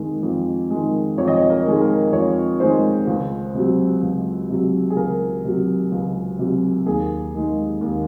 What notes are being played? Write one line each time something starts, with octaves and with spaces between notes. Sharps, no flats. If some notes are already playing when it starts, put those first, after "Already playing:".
Already playing: F2 D#3 G#3
F2
D#3 G#3
F2 C#5
D#5
C#5
A#4
D#3 G#3 G#4
A#4
F2 C#5
D#3 G#3 C5
C#2
C3 F#3
C#2
C3 F#3
G#4
C#2 A#4
C3 F#3
C#2
C3 F#3
D#2 G#4
D#3 G#3
D#2